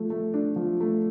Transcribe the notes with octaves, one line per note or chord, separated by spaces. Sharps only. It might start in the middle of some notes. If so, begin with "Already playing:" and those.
Already playing: F3 A3
A3
D4
F3
A3